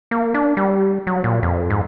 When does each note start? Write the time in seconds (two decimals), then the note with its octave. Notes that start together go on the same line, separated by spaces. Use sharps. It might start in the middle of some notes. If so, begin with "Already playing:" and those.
0.11 A#3
0.34 D4
0.57 G3
1.07 F#3
1.24 A#2
1.43 F2
1.70 G#2